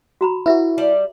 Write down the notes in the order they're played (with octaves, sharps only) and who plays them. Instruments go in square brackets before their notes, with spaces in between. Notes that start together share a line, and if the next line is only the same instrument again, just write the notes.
[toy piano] F#4 A#5 B5
[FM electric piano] E4 F#4 [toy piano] B4 E5
[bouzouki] G3 D5 A5